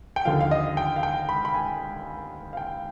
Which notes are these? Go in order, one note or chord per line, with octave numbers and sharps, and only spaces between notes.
G5
D#2 D3 F3 F5
F5
D#5
G5
F5
G5
B5
B5
G#5
F5
G5